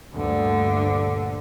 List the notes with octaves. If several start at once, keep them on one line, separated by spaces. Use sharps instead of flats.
D2 G2 A#2 D3